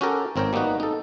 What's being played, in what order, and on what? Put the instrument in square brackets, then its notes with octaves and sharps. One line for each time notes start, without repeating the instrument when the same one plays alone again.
[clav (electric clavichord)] C#4 F#4 G4 A4 A#4 G5
G#1 C4 A#4 C#5 G5
G3 A#3 B3 D#4 F#4
D#4 A4